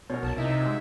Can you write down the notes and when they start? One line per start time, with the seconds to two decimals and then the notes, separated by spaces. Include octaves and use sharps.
0.10 B2 A#4 C#5
0.23 B1 A5
0.38 C3 D#4 E4 E5
0.62 G#3 F#4